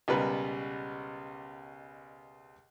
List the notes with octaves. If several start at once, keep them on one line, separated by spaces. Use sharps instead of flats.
C#2 B2 G3 A#4 B4